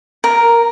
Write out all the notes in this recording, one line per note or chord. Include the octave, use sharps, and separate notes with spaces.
A#4